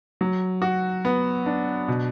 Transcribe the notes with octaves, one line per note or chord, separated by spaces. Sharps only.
F#3
F#4
B3
D4
B2